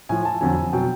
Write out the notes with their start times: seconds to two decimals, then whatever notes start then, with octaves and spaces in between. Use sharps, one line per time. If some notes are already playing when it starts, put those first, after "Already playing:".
0.09 A2 F3 G#5
0.25 A5
0.41 F2 D3 F#3 G#5
0.73 B2 F#3 G5